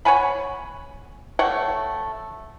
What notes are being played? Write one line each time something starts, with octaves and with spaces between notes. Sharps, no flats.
C#5 F#5 G#5 B5
A3 C#5 F#5 G5